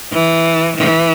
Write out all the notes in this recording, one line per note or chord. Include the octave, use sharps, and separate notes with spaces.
E3
E3